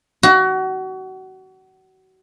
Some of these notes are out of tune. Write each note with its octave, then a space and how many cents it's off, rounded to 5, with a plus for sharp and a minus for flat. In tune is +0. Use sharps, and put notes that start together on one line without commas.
F#4 +30